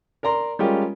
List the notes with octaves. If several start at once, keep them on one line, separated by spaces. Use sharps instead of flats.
A#4 D5 A#5 C6
G3 G#3 C#4 F4 G4 A#4